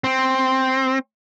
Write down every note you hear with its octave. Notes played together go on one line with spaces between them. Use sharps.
C4